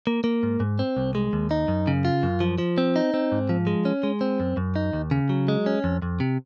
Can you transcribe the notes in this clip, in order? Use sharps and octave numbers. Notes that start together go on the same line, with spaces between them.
A#3
A#3
G#2
G#2
C4
C2
G#3
D#2
D#4
F#2
C#3
F4
F#2
F3
F3
C4
D#4
C4
G#2
F3
G#3
C#4
G#3
C4
F#2
F#2
D#4
D#2
C#3
F#3
G#3
C#4
F2
F2
C3